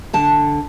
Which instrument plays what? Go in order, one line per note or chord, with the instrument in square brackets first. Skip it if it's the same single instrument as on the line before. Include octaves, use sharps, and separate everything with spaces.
[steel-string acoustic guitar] D3 A5